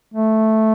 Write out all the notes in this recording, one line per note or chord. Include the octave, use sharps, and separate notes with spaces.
A3